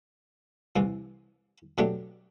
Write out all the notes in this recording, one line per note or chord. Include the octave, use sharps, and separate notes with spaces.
C2 C3 E3
B2 F#3 A3 D4 G4